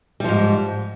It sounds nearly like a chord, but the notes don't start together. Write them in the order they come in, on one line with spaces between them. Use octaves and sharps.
G3 F3 G#2